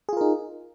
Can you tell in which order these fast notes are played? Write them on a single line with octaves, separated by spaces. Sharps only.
G#4 F4 A#4 D#4